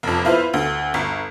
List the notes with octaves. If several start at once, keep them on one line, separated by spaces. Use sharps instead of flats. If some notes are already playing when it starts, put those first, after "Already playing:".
F1 F2
E4 F4 B4 C5
D2
G1